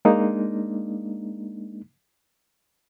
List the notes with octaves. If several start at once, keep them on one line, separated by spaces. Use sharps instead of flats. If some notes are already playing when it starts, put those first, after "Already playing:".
G#3 A#3 D4 D#4